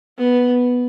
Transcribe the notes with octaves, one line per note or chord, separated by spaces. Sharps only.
B3